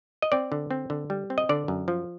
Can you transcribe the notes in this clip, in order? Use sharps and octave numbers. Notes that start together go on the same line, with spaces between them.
D#5
C4 D5
D3
C4
D3
G3
C4
D#5
D3 D5
F#2
F3